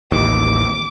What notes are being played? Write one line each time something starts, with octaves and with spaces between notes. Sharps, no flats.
A1 D#2 D6